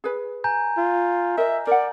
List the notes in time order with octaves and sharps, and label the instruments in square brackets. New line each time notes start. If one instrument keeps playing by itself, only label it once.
[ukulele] G#4 B4
[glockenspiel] G#5 A#5 G6
[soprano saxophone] F4
[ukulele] A#4 D#5 [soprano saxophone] E5
[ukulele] A#4 F#5 [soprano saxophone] D5